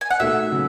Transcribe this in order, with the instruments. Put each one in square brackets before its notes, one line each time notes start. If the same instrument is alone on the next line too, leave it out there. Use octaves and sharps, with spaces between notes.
[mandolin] G#5
F#5
[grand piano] B2 A3 D#4 A4 [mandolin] E5
[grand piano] C#3 F#3